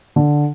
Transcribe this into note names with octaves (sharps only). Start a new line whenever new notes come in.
D3